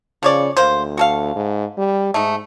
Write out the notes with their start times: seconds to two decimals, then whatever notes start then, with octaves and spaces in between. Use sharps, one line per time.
0.23 C#3 F3 C#5 D5
0.57 D2 A#3 C5
0.97 F#4 A4 F5
1.36 G#2
1.78 G3
2.14 G#2 A3 D#4